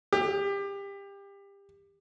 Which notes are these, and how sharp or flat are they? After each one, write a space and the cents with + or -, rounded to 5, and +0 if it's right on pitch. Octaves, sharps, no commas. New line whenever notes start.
G4 +25